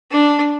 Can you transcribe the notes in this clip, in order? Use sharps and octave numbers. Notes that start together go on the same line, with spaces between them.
D4